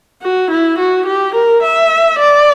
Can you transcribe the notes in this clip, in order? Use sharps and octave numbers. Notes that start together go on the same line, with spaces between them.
F#4
E4
F#4
G4
A#4
E5
D5